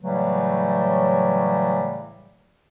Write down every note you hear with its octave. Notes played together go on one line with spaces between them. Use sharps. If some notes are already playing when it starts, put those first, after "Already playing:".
A2 C#3 E3 F#3 G3 A3